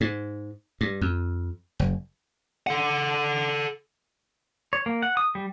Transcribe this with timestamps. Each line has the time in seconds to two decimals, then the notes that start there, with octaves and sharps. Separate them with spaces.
0.01 G#2
0.81 G2
1.01 F2
1.80 F#1
2.67 A4 F#5
4.73 C#5
4.86 A#3
5.03 F#5
5.17 D#6
5.35 G3